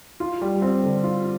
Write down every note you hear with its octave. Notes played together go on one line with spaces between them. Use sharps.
F4
G3
C4
D3
F4